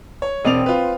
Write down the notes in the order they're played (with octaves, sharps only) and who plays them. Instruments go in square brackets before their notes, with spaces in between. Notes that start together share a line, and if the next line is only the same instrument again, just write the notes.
[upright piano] C#5
[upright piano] E1 D5 F7 [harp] C4 D#5
[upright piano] F4 B4